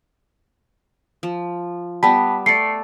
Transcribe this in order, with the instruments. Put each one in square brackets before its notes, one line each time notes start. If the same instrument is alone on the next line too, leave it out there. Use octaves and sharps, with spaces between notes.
[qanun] F3
[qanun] G3 B3 [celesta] A5 B5 B6
[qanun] A3 D5 [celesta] C7 C#7